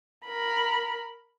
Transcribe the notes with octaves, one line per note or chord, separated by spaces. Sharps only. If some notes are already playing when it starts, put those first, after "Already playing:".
A#4 B5